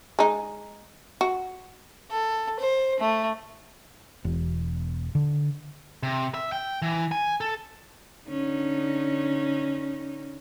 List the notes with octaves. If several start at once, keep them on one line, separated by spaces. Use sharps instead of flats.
G#3 D#4
F#4
A4
C5
A3
E1
D3
C3
E5
G5
E3
G#5
A4
D3 C#4 D#4